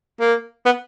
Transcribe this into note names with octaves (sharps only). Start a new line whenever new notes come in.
A#3
B3